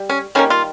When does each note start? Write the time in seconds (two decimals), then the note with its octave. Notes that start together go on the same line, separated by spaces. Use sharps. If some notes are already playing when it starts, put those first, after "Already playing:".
Already playing: G3
0.10 C#4
0.35 D#3 G3 A#3 C#4
0.50 F4